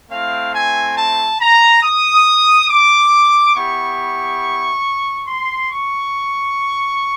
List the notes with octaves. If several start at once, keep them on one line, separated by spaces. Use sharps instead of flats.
A3 C4 E4 F5
G#5
A5
A#5
D#6
D6
B3 E4 G4 C#6
C6
C#6